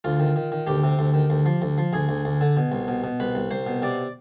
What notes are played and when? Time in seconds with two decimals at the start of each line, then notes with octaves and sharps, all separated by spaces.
0.04 D2 F4
0.20 D#3
0.36 D#3
0.52 D#3
0.67 D2 G4
0.84 C3
0.99 D2
1.14 D#3
1.30 D2
1.46 F3
1.62 D2
1.78 F3
1.93 D2 G#4
2.09 D2
2.25 D2
2.41 D3
2.57 B2
2.72 C2
2.88 B2
3.04 B2
3.20 C2 B4
3.35 C2
3.51 C2 C5
3.67 B2
3.82 C3 D5